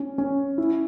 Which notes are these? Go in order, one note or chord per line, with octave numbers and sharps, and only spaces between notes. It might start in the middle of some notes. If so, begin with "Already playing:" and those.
Already playing: C#4
C#4
E4